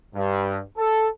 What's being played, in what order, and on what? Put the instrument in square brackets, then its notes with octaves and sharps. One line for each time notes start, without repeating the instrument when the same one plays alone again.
[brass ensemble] G2
A4